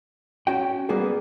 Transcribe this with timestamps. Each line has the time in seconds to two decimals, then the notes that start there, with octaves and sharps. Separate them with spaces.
0.47 C#4 F#4 G5
0.89 G3 A#3 B3 F#4 G#4